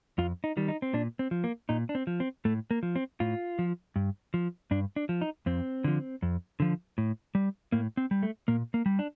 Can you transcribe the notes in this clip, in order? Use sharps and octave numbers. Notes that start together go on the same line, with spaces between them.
F2 F4
D#4
D#3 G3
D#4
C4
A#2 D4
C4
F3
A#3
A#2 D#4
D4
C4
F3
C4
A2 A3
A#3
F3
C4
A2 F4
F3
G2
F3
G2 D4
D4
F3
D#4
F2 C4
D3 F3
F2
D3 F3
A2
G3
A2 A#3
C4
G3
A3
A#2 A#3
A#3
G3
D4